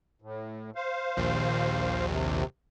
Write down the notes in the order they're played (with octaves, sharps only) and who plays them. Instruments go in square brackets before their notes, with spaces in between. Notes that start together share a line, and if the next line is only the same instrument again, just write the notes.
[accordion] A2
C5 F5
[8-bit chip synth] A#1 D#2
[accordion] C3